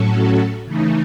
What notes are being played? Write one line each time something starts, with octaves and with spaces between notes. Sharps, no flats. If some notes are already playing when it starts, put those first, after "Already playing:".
Already playing: A2 F#3 C#4 F#4 A4
C#3 E3 A3 D#4